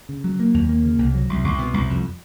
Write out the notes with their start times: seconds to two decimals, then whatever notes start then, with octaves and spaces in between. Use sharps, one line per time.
0.09 C#3
0.24 F#3
0.40 A#3
0.54 D#2
0.69 A#3
0.84 C#3
0.99 C2
1.14 F#3
1.29 C2
1.44 C2
1.59 B2
1.74 C2
1.89 F2